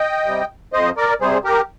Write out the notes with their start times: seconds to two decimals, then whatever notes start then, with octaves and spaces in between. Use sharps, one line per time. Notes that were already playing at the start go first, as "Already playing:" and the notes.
Already playing: D#5 G5
0.26 C3 G3
0.73 F2 C5 D#5
0.97 A#4 D5
1.21 C3 G3 G#4 C5
1.44 G4 A#4